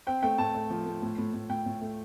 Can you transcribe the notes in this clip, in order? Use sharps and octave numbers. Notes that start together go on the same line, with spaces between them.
C4 G5
A3 G5
A2 A5
A3
F3
A3
A2
A2
A2
A2 G5
A2
A3